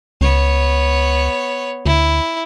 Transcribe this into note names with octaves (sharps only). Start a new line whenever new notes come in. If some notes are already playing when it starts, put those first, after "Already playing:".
C#2 B3 C#5
D2 E4